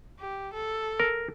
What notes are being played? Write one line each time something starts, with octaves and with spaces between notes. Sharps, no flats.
G4
A4
A#4